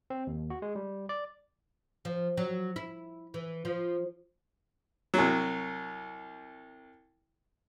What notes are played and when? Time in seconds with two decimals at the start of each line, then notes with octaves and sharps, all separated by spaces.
0.10 C4
0.27 D#2
0.50 F#4
0.62 G#3
0.75 G3
1.09 D5
2.05 F3
2.37 F#3
2.76 E4
3.34 E3
3.65 F3
5.14 C2 F#3